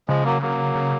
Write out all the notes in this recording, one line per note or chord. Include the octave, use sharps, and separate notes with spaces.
C#3 F3 G#3
F#3 A#3
F#3 A#3
C#3